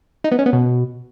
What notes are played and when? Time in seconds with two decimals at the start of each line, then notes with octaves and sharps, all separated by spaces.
0.24 D#4
0.32 B3
0.39 C#4
0.46 B3
0.53 B2